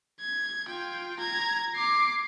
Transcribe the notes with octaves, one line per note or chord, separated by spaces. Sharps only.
G#6
F4 G5
A#5 G#6
D6 C7